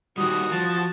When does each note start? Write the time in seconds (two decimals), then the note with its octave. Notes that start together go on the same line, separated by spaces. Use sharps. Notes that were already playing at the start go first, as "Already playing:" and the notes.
0.18 D#3 G3 F#4 D#6
0.52 F3 A5